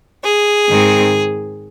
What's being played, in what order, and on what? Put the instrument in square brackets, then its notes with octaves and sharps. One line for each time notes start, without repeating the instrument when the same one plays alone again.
[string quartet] G#4
G#2 D#3 G#3 C4